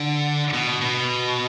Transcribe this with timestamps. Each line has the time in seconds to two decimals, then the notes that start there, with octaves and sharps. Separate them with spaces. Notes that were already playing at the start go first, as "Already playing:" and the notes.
Already playing: D3
0.54 B2
0.81 B2